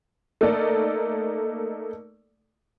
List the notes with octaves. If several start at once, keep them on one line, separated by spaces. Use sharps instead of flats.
A3 A#3 D#4 A4 D5